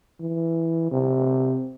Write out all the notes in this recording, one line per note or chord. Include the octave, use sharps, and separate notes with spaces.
E3
C3